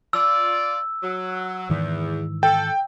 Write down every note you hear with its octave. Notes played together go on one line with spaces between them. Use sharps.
F4 D5 E6
F#3
E2 G#2 D#3 E3
A4 G5